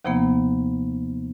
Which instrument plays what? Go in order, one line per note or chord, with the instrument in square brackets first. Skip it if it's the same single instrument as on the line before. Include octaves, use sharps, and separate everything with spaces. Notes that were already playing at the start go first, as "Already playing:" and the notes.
[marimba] D#2 C3 F3 A#3 B3